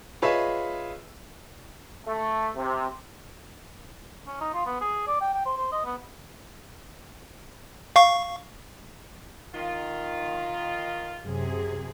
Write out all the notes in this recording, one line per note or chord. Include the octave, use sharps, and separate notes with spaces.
F4 G#4 B4 C#5 D#5 E5
A3
C3
C#4
D#4
F4
B3
G#4
D5
G5
G5
C5
C5
D#5
B3
F5 C#6
D#3 F4
F#2 C3 G#4